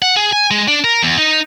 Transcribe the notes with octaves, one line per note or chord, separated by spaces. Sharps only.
F#5
G#4
G#5
G#3
D4
A#4
E2
D#4